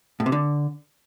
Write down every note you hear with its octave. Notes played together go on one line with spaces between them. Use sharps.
A2
C3
D3